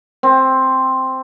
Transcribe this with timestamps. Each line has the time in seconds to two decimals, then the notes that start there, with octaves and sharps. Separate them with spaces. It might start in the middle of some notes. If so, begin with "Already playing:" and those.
0.23 C4